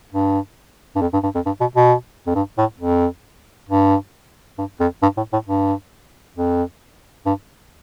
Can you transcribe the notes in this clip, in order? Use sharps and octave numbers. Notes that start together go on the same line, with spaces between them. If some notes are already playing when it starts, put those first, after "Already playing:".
G2
G2
F2
G2
G2
F2
G2
B2
B2
F2
G2
A2
F2
G2
G2
F2
G2
A2
A2
G2
F2
G2